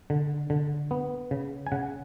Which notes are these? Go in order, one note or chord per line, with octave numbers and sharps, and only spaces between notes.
D3
D3
B3
C#3
G#5
C#3 F#5